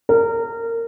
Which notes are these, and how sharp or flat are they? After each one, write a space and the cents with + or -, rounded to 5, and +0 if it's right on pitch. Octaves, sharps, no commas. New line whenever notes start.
A#4 -20